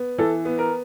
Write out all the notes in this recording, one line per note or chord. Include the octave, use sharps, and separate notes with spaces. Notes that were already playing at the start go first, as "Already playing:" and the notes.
Already playing: B3
E3 A4
B3
A#4